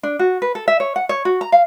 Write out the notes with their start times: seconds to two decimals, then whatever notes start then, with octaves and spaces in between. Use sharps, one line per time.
0.03 D4
0.19 F#4
0.42 B4
0.55 A4
0.68 E5
0.80 C#5
0.96 F#5
1.09 C#5
1.25 F#4
1.41 A#5
1.52 F5